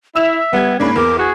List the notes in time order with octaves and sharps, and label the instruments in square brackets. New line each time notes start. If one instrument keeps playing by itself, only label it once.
[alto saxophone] E4 [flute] E5 [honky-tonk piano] E6 E7 F7
[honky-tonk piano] G3 G#6 [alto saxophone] B3
[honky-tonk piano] G#2 A#3 B5 [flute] C#4 [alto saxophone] D4
[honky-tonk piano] E2 [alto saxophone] A#4 [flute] D6
[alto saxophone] F#4 [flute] G#4